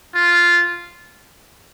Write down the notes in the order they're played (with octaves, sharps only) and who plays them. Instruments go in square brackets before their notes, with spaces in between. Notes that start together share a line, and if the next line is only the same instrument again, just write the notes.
[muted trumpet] F4